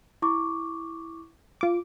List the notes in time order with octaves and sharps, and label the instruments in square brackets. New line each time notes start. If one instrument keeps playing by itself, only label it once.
[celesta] E4 C#6 D6
[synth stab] F4 D6